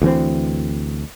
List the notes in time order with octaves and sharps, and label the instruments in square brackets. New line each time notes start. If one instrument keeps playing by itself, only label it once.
[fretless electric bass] D2 E3 C4